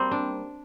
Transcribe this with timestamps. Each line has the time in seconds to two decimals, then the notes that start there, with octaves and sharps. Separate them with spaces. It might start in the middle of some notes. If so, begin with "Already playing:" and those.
Already playing: G3 A#3 C4
0.11 D4